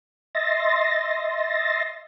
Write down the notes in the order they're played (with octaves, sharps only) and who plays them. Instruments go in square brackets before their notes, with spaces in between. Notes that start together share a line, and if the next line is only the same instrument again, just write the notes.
[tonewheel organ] D#5 E5 C6 A6 A#6